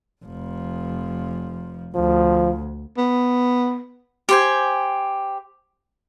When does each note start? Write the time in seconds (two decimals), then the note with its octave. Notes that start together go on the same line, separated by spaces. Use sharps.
0.24 F1 F3
1.95 D2 F3
2.97 B3
4.29 G4 C5 G#5